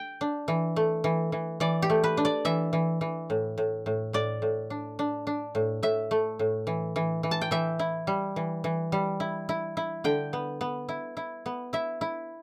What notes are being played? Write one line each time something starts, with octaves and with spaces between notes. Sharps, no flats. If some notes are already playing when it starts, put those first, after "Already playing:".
Already playing: G5
D4
E3
A3
E3
E3
E3 D5
G4
A3
B4
D4
D5
E3 E5
E3
E3
A2
A2
A2
A2 D5
A2
D4
D4
D4
A2
A2 E5
A3
A2
E3
E3
E3
A5
G5
E3 E5
E4
G3
E3
E3
G3
E4
E4
E4
D3 G5
B3
B3
E4
E4
B3
E4 E5
E4